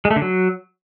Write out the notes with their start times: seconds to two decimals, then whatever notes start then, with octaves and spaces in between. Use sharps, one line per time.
0.05 G#3
0.11 A3
0.16 D3
0.22 F#3